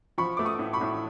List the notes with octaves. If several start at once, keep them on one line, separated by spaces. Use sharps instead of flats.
F3 B5 C#6
A3 D6
C#6 D#6
A2
B5 C#6
A2